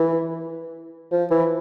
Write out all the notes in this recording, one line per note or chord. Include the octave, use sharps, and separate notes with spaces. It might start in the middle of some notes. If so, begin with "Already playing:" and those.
Already playing: E3
F3
E3